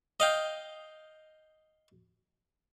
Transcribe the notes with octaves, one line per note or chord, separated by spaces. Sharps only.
D#5 F5 G5